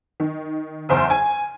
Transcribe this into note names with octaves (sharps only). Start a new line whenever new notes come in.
D#3
F#1 E2 C5
G#5